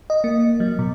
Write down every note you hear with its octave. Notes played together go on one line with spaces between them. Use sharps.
D#5
A#3
F#3
B2